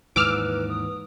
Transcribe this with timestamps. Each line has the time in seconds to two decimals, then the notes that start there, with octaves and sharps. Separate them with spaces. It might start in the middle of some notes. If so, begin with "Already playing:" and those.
0.16 D#2 G#2 E3 B4 D6 E6 F6
0.70 D#6